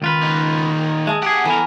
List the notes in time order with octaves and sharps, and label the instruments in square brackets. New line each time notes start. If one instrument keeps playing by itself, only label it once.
[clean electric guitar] C#2 F4 B4 [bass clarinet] D#3
[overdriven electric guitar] A#2 D#4
[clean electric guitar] G#3 [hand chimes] E5 A5 D#6
[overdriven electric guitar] F2 F#5 [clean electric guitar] G4 G#4
[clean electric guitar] E3 A#4 [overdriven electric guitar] B3 A4 [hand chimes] G#5